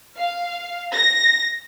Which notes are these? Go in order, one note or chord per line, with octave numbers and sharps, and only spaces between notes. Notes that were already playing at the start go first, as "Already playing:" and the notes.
F5
A#6